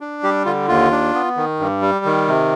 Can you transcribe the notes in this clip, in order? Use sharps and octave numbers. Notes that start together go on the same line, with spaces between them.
D4
G3 G4
D3 F4
D#2 F4
D4
B3
D#3
G2
G3
D#3
C3